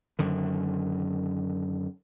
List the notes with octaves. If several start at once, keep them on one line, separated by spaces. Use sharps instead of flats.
F#2 D3 D#3